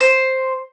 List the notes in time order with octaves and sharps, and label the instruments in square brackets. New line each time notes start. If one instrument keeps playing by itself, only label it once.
[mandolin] C5